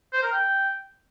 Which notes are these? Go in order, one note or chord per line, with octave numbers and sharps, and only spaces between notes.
C5
A#4
G5